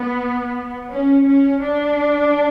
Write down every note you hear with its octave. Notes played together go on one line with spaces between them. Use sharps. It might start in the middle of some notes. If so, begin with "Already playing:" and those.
Already playing: B3
C#4
C#4
D4